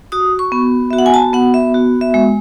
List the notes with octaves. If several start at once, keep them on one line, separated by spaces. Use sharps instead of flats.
F#4 D#6
C#6
B3
F#4 E5
F#5
G#5
A5
B3 F#5
E5
F#4
E5
G#3